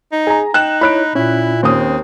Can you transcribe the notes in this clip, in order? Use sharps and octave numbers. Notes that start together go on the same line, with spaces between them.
D#4
G#4 G#5 A#5
D#4 G5 F#6 E7
E4 C#5 B5 F#6 D7
A#2 C#4 E4
D#2 C4 C#4 D#6